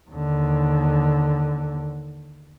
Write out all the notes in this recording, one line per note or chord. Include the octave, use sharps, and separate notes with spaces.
D#2 D3